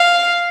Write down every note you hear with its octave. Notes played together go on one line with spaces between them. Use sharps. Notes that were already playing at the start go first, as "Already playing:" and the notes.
Already playing: F5